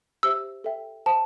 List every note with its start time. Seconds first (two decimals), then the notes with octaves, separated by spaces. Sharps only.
0.23 G4 C5 E5 E6
0.64 A4 E5 G5
1.06 C5 F5 A5